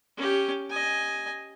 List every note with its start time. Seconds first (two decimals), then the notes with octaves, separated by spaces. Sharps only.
0.17 C#4 G4
0.70 D#5 G#5